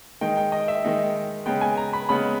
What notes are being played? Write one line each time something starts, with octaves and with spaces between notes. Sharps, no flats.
D#3 G#3 D#4 G5
G5
D#5
E5
D#3 G#3 D#4
C#3 G#3 B3 G5
G#5
A#5
B5
C#3 G#3 B3 B5